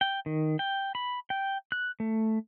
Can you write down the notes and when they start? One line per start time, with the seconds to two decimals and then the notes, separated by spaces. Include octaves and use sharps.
0.01 G5
0.26 D#3
0.59 G5
0.95 B5
1.30 G5
1.72 F#6
2.00 A3